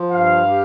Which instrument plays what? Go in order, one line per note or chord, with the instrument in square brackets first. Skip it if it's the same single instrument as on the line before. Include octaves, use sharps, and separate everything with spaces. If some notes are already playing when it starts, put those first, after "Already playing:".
Already playing: [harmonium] F3
[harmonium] G2 [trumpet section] F5
[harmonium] G4